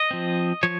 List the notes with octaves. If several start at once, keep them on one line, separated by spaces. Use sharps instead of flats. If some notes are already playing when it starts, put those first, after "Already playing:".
Already playing: D#5
F3 C4
F3 C#5